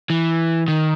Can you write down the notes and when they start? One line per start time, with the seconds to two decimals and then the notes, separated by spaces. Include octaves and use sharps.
0.10 E3
0.68 D#3